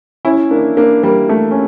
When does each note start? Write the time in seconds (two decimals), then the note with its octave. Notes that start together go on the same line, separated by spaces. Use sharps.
0.25 C#4 E4
0.51 A#3 D4
0.77 A#3 D4
1.03 G3 A#3
1.29 A3
1.51 C#4